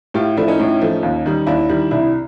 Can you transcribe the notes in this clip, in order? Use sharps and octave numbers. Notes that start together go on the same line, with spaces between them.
A2 F4 G4
F3 A3 D4 E4
C#4 D#4
A2
F3 A3
D#2
D#3 G3
D#2 D4 E4
D#3 G3
C2 D4 E4